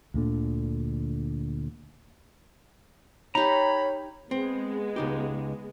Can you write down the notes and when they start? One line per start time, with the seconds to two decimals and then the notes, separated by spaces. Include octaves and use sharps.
0.14 D2 A#2 D3
3.35 D#4 G4 C#5 A#5 B5
4.31 G#3 B3 C4
4.96 C#2 D#4 G4